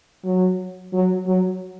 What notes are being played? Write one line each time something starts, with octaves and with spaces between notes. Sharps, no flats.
F#3
F#3
F#3